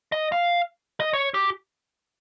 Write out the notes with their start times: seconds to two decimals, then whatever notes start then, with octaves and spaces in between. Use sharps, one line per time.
0.12 D#5
0.32 F5
1.00 D#5
1.13 C#5
1.34 G4